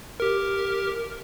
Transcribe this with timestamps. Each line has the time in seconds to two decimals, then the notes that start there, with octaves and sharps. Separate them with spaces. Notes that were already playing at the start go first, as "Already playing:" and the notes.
0.20 G4 A#4